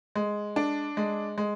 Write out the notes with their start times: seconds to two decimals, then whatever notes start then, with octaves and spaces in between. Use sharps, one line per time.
0.16 G#3
0.56 D4
0.97 G#3
1.38 G#3